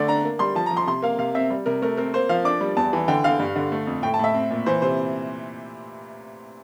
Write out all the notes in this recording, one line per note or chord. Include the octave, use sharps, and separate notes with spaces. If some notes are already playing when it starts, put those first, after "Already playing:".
Already playing: D3 A3 D5
D4 A#5
A#3
G3 C6
F3 A5
A#5
F3
C6
C3 C6
A#3 F5
C3 F5
C4 E5
G3
C3 A#4
A3 A#4
C4 A#4
A#3 C5
F3 F5
D4 D6
G3
E2 A5
E3
D3 G5
D3 F5
G2
D3
A3
F2
A2 G5
A5
A2 E5
C4
A#2
E3 C5
C3 C5